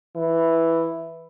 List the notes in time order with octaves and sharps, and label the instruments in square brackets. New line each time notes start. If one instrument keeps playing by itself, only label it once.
[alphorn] E3